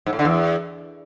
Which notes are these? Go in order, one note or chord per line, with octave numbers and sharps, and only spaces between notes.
G#2
A2
D3
E2